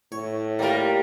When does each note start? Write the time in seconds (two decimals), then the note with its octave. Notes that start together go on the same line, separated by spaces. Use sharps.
0.12 A2 C#5
0.59 G3 A#3 F4 A#4